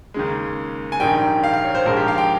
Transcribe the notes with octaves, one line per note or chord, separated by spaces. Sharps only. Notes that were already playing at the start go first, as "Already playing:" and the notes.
D#2 C#3 G#3
G#5
A#1 G#2 D#3 G3 G5
F5
F5
C#5
C5
A#1 G#2 F3 G#3 A#4
G4
F5
G5